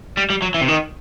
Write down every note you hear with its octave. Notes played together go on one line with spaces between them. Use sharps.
G3
G3
F#3
E3
C3
D#3